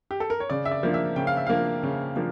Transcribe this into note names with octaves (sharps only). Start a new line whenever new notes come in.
G4
A4
A#4
C#5
C#3 D5
E5
D5
F3 A#3 D4
E5
C#3 G5
F5
E5
F3 A#3 D4 F5
C#3
F3 A#3 D4